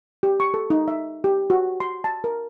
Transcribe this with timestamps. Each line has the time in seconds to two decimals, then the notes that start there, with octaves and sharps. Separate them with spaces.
0.23 G4
0.40 C#6
0.54 A4
0.70 D#4
0.88 E5
1.24 G4
1.50 F#4
1.80 C6
2.04 A5
2.24 A#4